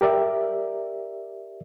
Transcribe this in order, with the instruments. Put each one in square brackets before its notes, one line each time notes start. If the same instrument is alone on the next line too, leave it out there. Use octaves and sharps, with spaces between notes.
[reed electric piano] G4 A#4 D5 E5